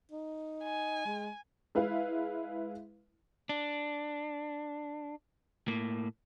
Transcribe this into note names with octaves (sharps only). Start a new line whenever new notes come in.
D#4
G#5
G#3
G#3 E4 B4 F5
D4
A2 A#3